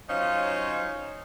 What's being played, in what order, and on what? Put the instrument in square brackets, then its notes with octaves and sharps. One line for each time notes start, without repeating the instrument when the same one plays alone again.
[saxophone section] F#3 C#4 D#4 F4 C5 F5